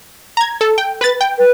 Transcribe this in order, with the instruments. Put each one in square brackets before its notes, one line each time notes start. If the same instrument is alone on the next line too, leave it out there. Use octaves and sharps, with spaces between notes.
[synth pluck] A#5 G#6
A4
G5
B4 B5 A6
G5
[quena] B4